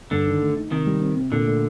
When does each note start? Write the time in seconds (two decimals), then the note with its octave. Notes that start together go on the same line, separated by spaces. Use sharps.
0.11 G2 D3
0.27 D#3
0.42 A3
0.57 D#4
0.72 C3 D#3
0.86 G3
1.01 C4
1.16 C3
1.32 A#2 D3
1.47 A3